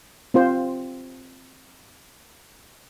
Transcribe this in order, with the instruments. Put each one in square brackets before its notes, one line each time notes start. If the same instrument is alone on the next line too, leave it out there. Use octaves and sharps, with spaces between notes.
[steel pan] C4 F4 C5